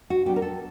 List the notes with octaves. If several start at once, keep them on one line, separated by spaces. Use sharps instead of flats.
F#4
F#3 B3 D4 G4
A#4
A4